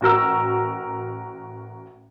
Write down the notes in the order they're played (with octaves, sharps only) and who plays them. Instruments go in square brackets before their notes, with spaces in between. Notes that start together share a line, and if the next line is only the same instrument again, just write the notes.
[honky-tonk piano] A1 F#4 A#4 E6